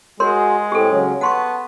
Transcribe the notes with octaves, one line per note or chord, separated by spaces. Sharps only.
G#3 F#4 G#4 A#4 C#5 C6
A2 C4 G4 A4
C#3 F#3 C#4
B3 F#5 A5 C6 C#6